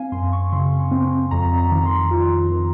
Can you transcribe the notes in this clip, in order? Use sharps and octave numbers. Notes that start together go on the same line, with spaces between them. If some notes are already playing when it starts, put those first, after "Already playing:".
Already playing: C4 F5 G#5
F#2 C6
C#6
C#3 C6
C4
F2 A#5
A#5
D#3
C6
F4
D#3